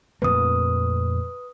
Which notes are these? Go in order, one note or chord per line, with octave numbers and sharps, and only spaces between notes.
F2 A#2 A3 B4 D#6